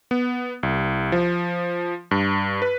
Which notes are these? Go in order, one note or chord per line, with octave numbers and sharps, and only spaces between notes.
B3
C2
F3
G2
B4